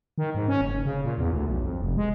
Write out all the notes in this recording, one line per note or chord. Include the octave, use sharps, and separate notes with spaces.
D#3
G#2
C#4
F#1
C#3
A#2
E2
D2
B1
F2
F1
G#3